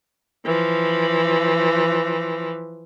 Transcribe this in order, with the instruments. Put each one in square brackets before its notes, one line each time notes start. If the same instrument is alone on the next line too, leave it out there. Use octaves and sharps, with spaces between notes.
[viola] E3 F3